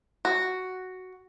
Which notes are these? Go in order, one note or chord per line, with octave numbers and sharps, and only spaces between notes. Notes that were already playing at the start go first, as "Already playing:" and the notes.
F#4